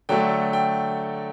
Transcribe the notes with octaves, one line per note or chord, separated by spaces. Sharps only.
D3 F#3 A3 G5
G5